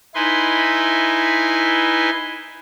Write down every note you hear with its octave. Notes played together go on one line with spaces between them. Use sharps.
D#4 E4 B4 G#5 C6